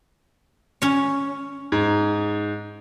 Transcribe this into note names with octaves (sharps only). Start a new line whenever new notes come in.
C#4 C#5
G#2